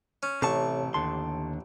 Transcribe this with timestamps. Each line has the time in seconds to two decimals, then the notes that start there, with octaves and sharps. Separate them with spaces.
0.23 C#4
0.42 A1 C3 A4 C#5 E5 A5 C#6
0.94 D#2 D3 A5 C6